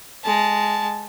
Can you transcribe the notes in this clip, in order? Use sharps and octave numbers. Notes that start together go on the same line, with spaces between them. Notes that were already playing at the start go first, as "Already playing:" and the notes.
G#3 A5